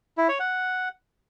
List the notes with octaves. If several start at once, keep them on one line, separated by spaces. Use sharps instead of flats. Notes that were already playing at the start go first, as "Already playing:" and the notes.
E4
C#5
F#5